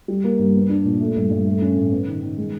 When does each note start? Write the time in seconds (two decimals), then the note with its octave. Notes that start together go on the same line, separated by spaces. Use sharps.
0.08 G3
0.24 A#3
0.39 G2
0.55 B3
0.69 D4
0.85 A#2
1.00 A3
1.16 G2
1.30 G2
1.46 A3
1.62 C#4
1.76 A2
1.92 B3
2.07 D#3
2.22 D#3
2.38 G#3